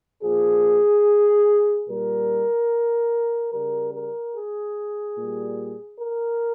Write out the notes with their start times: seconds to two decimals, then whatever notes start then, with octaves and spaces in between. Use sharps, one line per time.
0.23 A#2 F3 G#4
1.88 A#2 G3 A#4
3.52 C#3 G3 A#4
3.93 A#4
4.35 G#4
5.17 A#2 G3
6.00 A#4